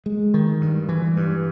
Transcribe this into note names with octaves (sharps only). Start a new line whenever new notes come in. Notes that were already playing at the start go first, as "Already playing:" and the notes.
G#3
D#3
G2
E3
G2